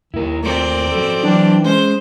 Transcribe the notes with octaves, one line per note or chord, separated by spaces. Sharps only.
D#2 D#3 E4 A#4
A3 C4 F4 A#4 D5
F3 F#4 A4
E3 F#3 D4 G5
G#3 C#4 C5